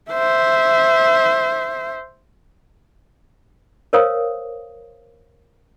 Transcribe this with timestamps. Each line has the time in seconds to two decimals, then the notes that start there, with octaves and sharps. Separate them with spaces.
0.10 C5 E5
3.93 A#4 C5 C#5 F5 D#6